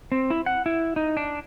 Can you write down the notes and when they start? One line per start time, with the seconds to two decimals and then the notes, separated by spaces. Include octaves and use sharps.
0.12 C4
0.30 E4
0.46 F#5
0.66 E4
0.96 D#4
1.17 D4